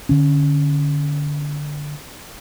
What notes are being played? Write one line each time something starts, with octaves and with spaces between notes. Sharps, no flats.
D3 C#4